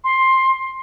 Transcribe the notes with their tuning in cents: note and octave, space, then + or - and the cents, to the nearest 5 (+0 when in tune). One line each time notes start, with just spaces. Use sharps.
C6 +10